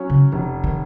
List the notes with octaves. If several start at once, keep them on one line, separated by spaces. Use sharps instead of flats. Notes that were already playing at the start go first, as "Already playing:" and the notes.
Already playing: F#3 C#4
C#3
F1 F3
D#3